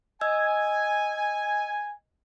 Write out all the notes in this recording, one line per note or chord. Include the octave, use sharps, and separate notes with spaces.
D#5 G#5 E6 G#6